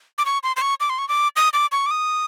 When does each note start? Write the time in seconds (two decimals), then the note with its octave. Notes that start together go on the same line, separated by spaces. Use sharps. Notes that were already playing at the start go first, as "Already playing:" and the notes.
0.18 D6
0.26 C#6
0.43 C6
0.56 C6
0.62 C#6
0.80 D6
0.90 C6
0.98 C#6
1.09 D6
1.36 D#6
1.53 D6
1.72 C#6
1.86 D6
1.91 D#6